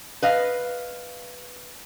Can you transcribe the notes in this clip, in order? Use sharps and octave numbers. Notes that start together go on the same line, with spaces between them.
B4 D#5 F5